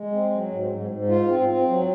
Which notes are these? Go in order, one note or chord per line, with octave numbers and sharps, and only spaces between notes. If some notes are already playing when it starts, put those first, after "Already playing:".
Already playing: G#3
C4
F#3
G#2
G#2
G#2
F4
C4
C4
F#3